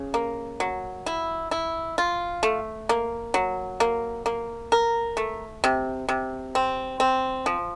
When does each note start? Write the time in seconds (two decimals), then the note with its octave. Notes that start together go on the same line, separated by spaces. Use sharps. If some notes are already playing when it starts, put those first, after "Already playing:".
Already playing: C#3
0.14 A#3
0.60 F#3
1.06 E4
1.51 E4
1.98 F4
2.43 A3
2.89 A#3
3.34 F#3
3.80 A#3
4.26 A#3
4.72 A#4
5.17 A3
5.64 C3
6.09 C3
6.55 C4
7.00 C4
7.46 F3